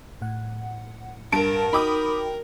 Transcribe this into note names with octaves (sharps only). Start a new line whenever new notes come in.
A2 F#5
G2 A#4 A5 D7
D#4 F#4 G5 B5 D6 D#6